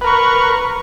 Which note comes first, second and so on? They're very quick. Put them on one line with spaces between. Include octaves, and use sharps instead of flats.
B4 A#4 C#6